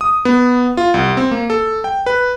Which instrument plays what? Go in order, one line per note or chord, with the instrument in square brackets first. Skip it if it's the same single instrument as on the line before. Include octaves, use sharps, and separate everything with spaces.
[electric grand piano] D#6
B3
F4
C2
C4
A#3
A4
G5
B4